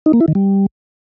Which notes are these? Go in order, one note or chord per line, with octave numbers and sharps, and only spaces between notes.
D#4
A#3
E4
D#3
G3